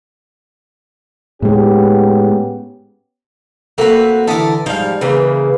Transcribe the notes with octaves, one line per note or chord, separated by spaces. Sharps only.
A2 G#3 B3 C#4 G4
A3 A#3 C4 F#4 B4
D3 E3 A4 A#4 D5 E5 D#6
G#2 F3 G3 D#4 D5 F5
C#3 E3 A#3 G#4 B4